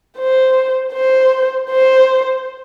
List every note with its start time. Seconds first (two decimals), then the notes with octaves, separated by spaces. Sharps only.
0.18 C5
0.93 C5
1.70 C5